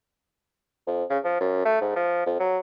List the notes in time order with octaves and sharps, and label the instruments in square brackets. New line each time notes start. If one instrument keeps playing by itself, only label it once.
[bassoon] F2
C#3
F3
F#2
A3
G#2
F3
F2
F#3